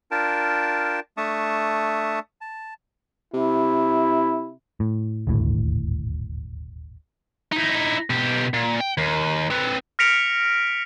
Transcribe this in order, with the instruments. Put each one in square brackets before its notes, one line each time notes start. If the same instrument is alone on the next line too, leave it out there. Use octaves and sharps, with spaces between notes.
[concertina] D4 F4 A#4 G5 A5
A3 D4 E5 A5 C#6 D#6
A5
[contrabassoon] C3 [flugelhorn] E4
[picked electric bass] A2
D#1 G#1 D2 A2
[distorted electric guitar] D#4 E4
B2 G4
A#2
G5
D#2
C4 B4
[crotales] F6 A#6 B6 C#7 D7 F7